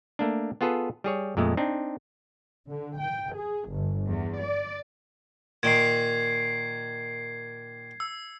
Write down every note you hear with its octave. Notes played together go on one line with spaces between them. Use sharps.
A3 A#3 D4
B3 F4 G#4 A4 B4
G3 G#4 C#5
F2 A#2 G#3 A3
C4 D4 D#4
D3
G5
G#4
G1
E2
D5
A#2 D#3 G#6 C7
E6